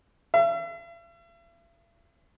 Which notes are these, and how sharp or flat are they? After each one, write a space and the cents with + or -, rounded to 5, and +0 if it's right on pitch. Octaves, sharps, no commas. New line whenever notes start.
E5 +45